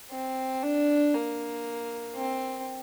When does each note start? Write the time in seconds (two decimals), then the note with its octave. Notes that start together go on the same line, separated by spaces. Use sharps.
0.11 C4
0.63 D4
1.14 A#3
2.16 C4